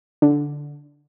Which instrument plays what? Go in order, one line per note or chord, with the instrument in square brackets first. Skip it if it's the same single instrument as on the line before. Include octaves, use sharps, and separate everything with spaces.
[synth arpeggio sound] D3